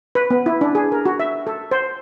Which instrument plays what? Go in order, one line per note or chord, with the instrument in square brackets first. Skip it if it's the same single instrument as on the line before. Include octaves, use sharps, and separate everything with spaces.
[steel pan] B4
B3
E4
D4
G#4
A#4
F#4
E5
A4
C5